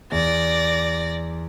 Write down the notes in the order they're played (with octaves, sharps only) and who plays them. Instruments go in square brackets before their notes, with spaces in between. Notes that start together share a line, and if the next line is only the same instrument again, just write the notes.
[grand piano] E2 [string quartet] D5 A#6